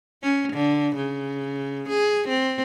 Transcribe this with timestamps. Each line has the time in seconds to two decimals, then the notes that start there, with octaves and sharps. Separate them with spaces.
0.23 C#4
0.53 D3
0.96 C#3
1.89 G#4
2.28 C4